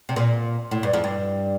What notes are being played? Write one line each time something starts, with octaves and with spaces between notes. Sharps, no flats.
C3
A#2
A2
G2
F2
G2